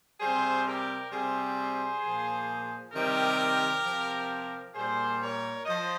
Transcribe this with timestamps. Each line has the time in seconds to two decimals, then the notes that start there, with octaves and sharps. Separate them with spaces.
0.20 C3 G3 G#4 C5
0.66 G4 A#4
1.11 C3 G3 G#4 C5
2.02 A#2 F3
2.93 C3 D#3 G3 G4 A#4
3.84 C3 F3
4.75 A#2 G3 G#4 C5
5.21 A#4 C#5
5.66 F3 C5 D#5